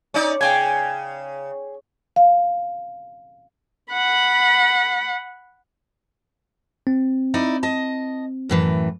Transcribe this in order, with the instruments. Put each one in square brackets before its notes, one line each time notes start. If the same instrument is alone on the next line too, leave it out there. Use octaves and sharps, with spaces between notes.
[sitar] C#4 D#4 D5
[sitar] C#3 [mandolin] G#4 G5 G#5
[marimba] F5
[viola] F#5 B5
[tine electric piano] C4
[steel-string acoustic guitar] D#4 E4 D5
D#5 A5
F#2 A2 E3